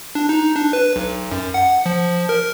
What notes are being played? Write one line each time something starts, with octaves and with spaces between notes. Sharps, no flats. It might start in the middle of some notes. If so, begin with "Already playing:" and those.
D4
D#4
D4
B4
B1
F#2
F#5
F3
A#4